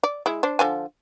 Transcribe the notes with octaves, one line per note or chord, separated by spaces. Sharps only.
D5
G#3 E4
D4 C5
D3 F3 G#5